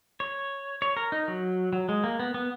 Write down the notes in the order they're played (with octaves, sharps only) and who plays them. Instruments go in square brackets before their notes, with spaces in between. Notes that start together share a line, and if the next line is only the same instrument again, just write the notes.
[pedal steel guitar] C#5
C#5
A#4
D#4
F#3
F#3
G#3
A#3
B3
B3